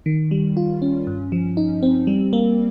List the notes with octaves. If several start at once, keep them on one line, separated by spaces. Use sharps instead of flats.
D#3
G3
F4
C#4
G2
F3
D#4
C4
G3
A#3